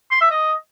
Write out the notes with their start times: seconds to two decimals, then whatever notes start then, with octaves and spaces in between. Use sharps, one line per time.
0.11 C6
0.21 E5
0.31 D#5